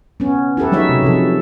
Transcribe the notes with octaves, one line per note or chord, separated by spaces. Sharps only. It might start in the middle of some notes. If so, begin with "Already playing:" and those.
B3 C#4
E4 G4 A4 B4
F#3 G#3 D#4 C#5 E5
C3 F#3
C3 F3 A4